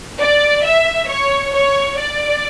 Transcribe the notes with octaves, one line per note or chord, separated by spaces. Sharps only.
D5
E5
C#5
C#5
D5